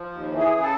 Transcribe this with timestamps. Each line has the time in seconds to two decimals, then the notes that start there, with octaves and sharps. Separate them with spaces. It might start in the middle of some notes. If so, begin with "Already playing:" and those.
Already playing: F3
0.12 D#2
0.31 E3
0.39 G#4
0.51 C#3
0.63 A4